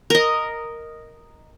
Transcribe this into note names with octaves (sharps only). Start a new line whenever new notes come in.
A#4 D#5